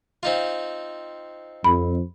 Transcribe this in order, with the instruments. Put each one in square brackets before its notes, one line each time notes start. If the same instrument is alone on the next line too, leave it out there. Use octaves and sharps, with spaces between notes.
[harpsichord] C4 D#4 F4
[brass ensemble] F2 [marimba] B5